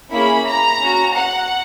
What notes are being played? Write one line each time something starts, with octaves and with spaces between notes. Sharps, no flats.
A#3 C#4 E4 G#4 B5
A#5
C#4 F#4
F#5